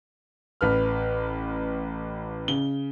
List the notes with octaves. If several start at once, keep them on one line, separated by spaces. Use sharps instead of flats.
A1 B4 F6
C#3 G7